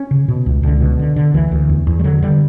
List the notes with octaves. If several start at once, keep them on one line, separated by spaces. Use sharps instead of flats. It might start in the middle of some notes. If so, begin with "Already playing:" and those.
Already playing: C#4
C#3
B2
C#2
C#2 D3
B2
D3
D3
D2 E3
D2
E2
E2
G3
D3 F#3
D3 G3